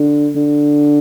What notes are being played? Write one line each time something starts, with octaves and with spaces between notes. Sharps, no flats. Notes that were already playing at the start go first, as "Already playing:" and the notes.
Already playing: D3
D3